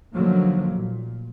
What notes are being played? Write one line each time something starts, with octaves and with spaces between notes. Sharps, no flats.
D3 D#3 F3 F#3 A3 A#3
A#2